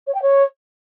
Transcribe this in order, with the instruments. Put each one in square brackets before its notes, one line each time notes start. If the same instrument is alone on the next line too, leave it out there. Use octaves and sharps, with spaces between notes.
[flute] C#5
G5
C#5